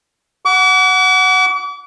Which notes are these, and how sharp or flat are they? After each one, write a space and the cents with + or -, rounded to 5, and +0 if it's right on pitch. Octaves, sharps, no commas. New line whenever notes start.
F#5 +0 D6 -40